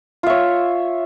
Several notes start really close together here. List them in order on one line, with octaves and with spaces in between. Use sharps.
F4 E5 C#5